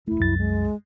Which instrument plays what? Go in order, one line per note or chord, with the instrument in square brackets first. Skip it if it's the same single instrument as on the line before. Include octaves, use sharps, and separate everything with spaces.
[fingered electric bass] E1 A3 [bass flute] E4
[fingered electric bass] C2 [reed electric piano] F#2 A6
[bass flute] G#3